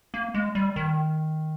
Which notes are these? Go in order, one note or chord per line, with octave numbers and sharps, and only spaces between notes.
A#3
G#3
G3
D#3